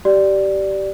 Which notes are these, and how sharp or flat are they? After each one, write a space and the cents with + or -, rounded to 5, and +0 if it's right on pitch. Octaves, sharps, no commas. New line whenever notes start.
G4 -20 D5 +0